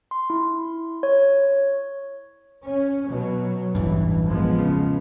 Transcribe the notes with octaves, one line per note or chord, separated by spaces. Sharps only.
C6
E4
C#5
C#4
B2 F#3
E1 A1 G2 E3
F3 G#3 B3
C#3